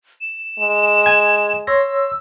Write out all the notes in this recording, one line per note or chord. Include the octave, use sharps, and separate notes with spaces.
E7
G#3
G#5 G#6
C#5 C6 E6 A#6